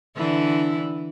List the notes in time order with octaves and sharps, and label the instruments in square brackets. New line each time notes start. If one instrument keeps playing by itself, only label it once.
[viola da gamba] D3 E3 E4